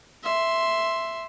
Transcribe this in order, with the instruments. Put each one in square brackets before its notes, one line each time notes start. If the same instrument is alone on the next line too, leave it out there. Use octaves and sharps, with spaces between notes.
[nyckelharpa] E5 C6